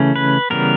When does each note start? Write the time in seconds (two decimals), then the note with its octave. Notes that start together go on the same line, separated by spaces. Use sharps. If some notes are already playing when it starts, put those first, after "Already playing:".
Already playing: C#3 E3 A3 C#4
0.16 B4
0.50 C#3 E3 G3 B3 A#4